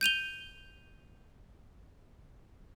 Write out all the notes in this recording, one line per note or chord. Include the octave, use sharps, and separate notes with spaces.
G6 D#7 F7 G7